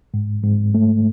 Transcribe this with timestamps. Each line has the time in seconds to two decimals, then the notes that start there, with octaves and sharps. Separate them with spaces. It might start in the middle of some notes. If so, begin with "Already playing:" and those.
0.14 G#2
0.44 G#2
0.75 A3